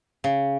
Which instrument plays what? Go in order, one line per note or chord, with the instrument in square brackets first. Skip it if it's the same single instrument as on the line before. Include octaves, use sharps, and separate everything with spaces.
[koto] C#3